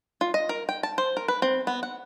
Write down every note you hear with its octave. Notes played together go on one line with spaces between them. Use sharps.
F4
D#5
A#4
G5
A5
C5
A#4
B4
C4
B3
F#5